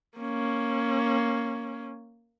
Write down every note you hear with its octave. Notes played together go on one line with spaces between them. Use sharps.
A#3 C#4